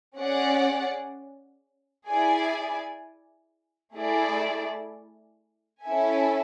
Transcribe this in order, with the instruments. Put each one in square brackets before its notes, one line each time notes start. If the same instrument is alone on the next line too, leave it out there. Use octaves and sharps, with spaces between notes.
[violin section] C#4 G#4 D5 F#5
E4 G#4 D5 G#5
A3 E4 G#4 D5
C#4 E4 A4 E5 G#5